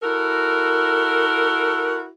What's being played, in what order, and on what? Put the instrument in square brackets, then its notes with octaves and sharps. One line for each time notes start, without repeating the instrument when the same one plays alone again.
[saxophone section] E4 F#4 A4 A#4